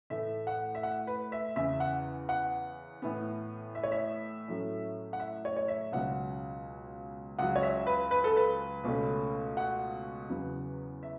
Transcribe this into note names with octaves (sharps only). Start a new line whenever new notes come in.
A2 E3 A3 E5
F#5
E5
F#5
B4
E5
E2 C#3 E3 E5
F#5
F#5
A2 E3 B3
E5
C#5
E5
A2 F#3 A3 C#4
F#5
E5
C#5
C#5
E5
C#2 B2 F#3 C#4 F#5
C#2 C#3 F#3 F#5
C#5
E5
B4
B4
A4
B4
C#2 B2 A3 C#4
F#5
E2 C#3 F#3 B3
E5